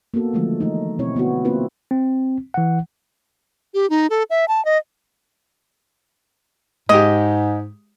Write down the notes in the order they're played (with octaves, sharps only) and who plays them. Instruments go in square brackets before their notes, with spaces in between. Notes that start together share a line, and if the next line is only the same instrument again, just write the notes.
[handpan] A#3 B3 F#4 A4
D3 D#3 F3 F#3 G#3 A3
E3 A3 D#4
B2 C4 E4 C#5
D3 B3 E4 F#4
A#3 C4 E4 F4 B4
[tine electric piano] C4
E3 F#5
[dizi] G4
D#4
A4
E5
A5
D#5
[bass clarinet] G#2 [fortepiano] G#3 G4 [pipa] D#5